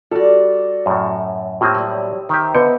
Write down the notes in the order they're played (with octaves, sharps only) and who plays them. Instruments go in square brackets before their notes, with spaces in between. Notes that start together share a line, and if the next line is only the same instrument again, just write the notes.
[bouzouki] G3 D5 [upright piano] F#4 A4
[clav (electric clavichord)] F#2 A2
[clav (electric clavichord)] A2 A#3 C4 [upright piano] G4 D#6 E6
[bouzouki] F#3 G3
[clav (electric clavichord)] D#3 G4 [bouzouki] C5 E5
[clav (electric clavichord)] D3 [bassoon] B3 [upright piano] D#5 G6 C#7